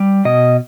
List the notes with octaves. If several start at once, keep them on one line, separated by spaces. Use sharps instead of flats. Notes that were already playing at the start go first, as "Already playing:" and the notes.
Already playing: G3
B2 D#5